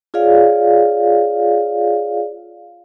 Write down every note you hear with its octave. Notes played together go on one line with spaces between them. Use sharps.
F4 G#4 C#5 D5 F5